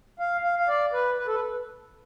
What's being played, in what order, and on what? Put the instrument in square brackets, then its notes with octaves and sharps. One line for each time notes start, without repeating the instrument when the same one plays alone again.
[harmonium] F5
F5
F5
D5
B4
B4
A4
B4